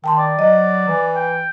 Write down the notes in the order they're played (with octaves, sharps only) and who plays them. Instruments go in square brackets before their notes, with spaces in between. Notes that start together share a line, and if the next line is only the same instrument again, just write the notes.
[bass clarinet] D#3 [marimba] G5 A5 C6
[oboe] D5
[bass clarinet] F#3 [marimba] D#5
[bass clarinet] E3
[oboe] G5